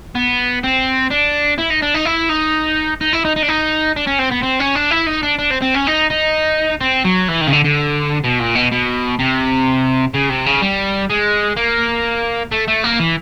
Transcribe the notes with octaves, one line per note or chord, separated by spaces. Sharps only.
B3
C4
D4
E4
D#4
D4
D#4
E4
D#4
D#4
E4
D#4
D#4
D4
D#4
D4
C#4
C4
B3
C4
C#4
D4
E4
D#4
D4
D4
C4
C4
C#4
D#4
D#4
C4
F#3
E3
D#3
C#3
D3
D3
B2
A#2
B2
B2
C3
C#3
C3
C#3
G3
G#3
A#3
A3
A3
A#3
E3